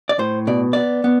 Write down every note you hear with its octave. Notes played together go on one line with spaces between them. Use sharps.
D5
A2 C5
B2 D5
B3 D5
B3